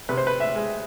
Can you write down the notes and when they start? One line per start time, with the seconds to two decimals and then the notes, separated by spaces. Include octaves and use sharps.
0.09 C3 B4
0.17 C5
0.27 B4
0.40 E5
0.56 G#3